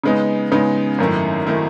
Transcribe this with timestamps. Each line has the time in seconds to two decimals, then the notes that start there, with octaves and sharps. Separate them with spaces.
0.04 C#3 G#3 B3 D#4
0.52 C#3 G#3 B3 D#4
0.98 G#1 F#2 D#3 A3 E4
1.47 D#3 A3 E4